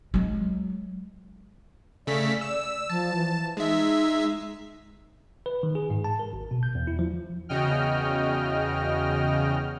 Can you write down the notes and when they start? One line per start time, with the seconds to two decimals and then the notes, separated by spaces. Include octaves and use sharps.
0.14 F#3 G#3
2.07 C#3 A3 D5 B6
2.41 E6
2.90 F3 A5
3.15 E3
3.57 G#3 D#4 E5
5.46 B4
5.63 D#3
5.75 G#4
5.90 G#2
6.04 A5
6.19 A#4
6.33 G#1
6.51 B2
6.63 G6
6.75 E2
6.87 E4
6.99 F3
7.49 E2 C#3 F#4 D#5 G5 F6